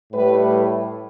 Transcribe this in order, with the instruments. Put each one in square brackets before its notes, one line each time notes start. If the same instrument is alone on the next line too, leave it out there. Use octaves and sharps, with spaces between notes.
[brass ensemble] A2 G3 B4